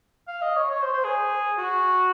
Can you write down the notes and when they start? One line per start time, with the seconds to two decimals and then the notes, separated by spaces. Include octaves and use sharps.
0.28 F5
0.42 D#5
0.56 C#5
0.71 C#5
0.82 C5
0.93 C5
1.04 G#4
1.58 F#4